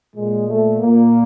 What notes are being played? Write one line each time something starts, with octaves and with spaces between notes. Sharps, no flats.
A#2 G#3
A3
A#2 A#3